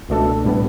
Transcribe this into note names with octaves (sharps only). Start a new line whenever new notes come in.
C#2 B2 A3 D4 A4
A2 G3 B3